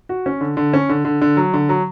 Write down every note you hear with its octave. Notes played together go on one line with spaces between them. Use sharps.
F#4
C#4
D3
D3
C#4
D3
D3
D3
F#3
D3
F#3